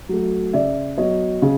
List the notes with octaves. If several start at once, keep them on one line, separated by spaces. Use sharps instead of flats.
F#3 A3
C#3 D5 E5
F#3 B3 C#5 D#5
C#3